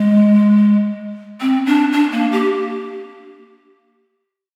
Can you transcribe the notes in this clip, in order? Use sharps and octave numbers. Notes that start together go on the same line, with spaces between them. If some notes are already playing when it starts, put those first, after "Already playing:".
Already playing: G#3
C4
D4
D4
A#3
G4